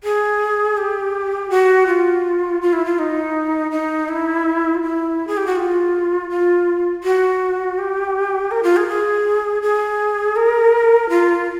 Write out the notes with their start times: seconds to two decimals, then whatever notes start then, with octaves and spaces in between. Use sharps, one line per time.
0.04 G#4
0.77 G4
1.50 F#4
1.87 F4
2.62 F4
2.73 E4
2.85 F4
2.99 D#4
3.71 D#4
4.09 E4
4.74 F4
4.82 E4
5.27 G#4
5.37 G4
5.46 F#4
5.56 F4
6.30 F4
7.04 F#4
7.78 G4
8.51 A#4
8.63 F4
8.77 G#4
8.88 G#4
9.62 G#4
10.36 A#4
11.09 F4